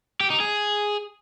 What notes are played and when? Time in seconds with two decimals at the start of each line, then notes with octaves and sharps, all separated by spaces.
0.20 G4
0.30 D#4
0.40 G#4